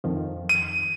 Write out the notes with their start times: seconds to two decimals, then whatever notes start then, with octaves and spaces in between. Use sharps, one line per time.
0.04 F2 D#3 F3
0.49 D#7